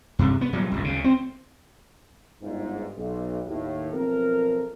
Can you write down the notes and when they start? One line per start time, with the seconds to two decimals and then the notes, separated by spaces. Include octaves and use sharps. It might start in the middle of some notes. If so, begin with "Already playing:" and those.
0.19 G2 C3
0.41 B3
0.53 A#2 F#3 G3
0.72 G1 C#2 F#2
0.84 D2 C#3
1.04 C4
2.42 G1 G#2
2.96 B1
3.47 D#2 A2
3.93 B1 F3 B3 C4 A4 A#4